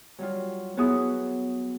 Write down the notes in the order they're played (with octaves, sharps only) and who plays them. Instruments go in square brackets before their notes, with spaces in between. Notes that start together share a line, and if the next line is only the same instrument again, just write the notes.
[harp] F#3 G3 F4
F#3 B3 E4 F#4 G#4 D#6